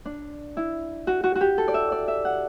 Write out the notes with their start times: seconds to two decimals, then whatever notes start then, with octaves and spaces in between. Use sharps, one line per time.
0.05 D4
0.57 E4
1.07 F#4
1.24 F#4
1.35 F#4
1.41 G4
1.58 A4
1.68 D5
1.74 E5
1.92 D5
2.08 E5
2.25 F#5